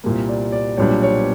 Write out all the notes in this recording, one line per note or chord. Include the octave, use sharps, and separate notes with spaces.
C2 A#2 G3 A#3
D5
D5
B1 A#2 G3 B3 D4 C#5
C#5